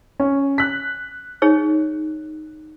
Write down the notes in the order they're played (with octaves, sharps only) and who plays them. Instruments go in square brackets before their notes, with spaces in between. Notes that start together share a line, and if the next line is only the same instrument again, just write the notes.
[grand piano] C#4
F#6 B6
[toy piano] D#4 G#4 C#5